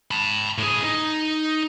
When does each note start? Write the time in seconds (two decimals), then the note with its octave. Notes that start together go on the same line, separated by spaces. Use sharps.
0.11 A5 B5
0.58 A2 G#4
0.83 D#4